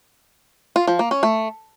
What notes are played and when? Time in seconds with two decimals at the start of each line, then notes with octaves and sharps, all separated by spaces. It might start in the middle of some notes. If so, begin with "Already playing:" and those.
0.76 F4
0.87 F3
0.99 A#3
1.11 C#4
1.23 A3